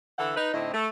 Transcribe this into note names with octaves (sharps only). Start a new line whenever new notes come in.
D3 E3 A4 E5 F#5
D#4 B4
A2 D3 C4 D#4 E4 D#5
A3